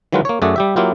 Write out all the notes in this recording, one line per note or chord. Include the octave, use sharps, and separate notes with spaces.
D#3 E3 F#3 G#3 F4 B4
A#3 C#5
F#2 A3 G#4 D5 F#5
G3 G4 E5
F#3 A#3 E4 F4 G4